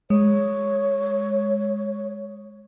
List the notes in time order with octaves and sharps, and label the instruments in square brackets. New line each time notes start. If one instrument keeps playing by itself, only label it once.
[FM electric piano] G#3 [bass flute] C#5